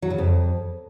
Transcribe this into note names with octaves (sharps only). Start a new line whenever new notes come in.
F#3
C#3
F2